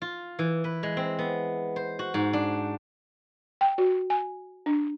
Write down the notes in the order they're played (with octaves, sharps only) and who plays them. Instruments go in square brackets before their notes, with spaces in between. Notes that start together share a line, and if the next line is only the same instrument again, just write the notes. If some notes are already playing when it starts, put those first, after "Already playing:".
[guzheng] F4
E3
B4
G#3
C4
B3
C5
F#4
G#2
D4
[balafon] G5
F#4
G#5
D4